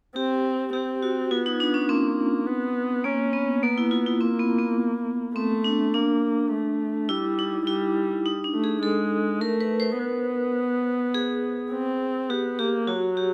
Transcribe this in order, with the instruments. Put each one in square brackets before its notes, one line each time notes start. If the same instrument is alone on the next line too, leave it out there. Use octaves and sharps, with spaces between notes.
[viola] C4 [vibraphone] G4
[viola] C4 [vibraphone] G4
[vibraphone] F#4
[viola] B3 [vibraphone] F4
[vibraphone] D#4
D4
C#4
[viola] A#3 [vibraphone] C4
[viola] B3
[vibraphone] A#3 [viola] C#4
[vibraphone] B3
[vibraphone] A#3 [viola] B3
[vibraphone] E4
F4
E4
[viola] A#3 [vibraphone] C4
[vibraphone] B3
B3
[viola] A3 [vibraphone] C4
[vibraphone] D4
[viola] A#3 [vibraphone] D4
[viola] A3
[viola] G3 [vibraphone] E4
[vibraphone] D#4
[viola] G3 [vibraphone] E4
[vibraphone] D#4
D4
[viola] A3
[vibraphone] G#4
[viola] G#3 [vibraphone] A4
[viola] A3 [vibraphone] A#4
[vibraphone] B4
C5
[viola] B3
[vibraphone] G#4
[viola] C4
[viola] B3 [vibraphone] G4
[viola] A#3 [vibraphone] G4
[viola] F#3 [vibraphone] F#4
[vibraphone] G4